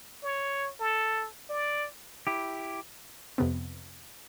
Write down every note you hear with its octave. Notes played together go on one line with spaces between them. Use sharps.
C#5
A4
D5
E4 G4
F2 C3 B3